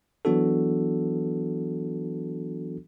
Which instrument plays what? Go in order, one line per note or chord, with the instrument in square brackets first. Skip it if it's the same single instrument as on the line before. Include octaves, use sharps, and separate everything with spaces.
[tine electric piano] E3 F#3 B3 D4 F#4 A4